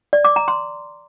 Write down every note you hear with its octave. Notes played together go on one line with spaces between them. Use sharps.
D5
D6
A#5
C6